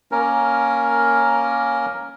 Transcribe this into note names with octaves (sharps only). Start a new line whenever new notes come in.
A#3 C#4 A#4